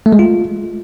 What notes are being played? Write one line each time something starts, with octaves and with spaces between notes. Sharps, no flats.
A3
G#3
F4